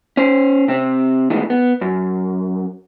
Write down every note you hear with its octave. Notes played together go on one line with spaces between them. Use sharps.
C#4 C5
C3 C4
A2 D#3 E3 G#3 B3
B3
F#2